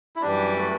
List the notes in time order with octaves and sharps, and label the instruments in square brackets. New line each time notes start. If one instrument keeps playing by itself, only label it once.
[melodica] E4
[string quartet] F#2 E3 G3 [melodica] D4
[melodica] A3